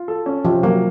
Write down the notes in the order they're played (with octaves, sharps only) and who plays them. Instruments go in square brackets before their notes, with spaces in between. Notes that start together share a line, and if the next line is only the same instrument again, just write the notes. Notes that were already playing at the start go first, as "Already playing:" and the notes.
Already playing: [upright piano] F4
A4
C#4
[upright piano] C3 [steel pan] F3
[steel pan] F#3 [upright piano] A#3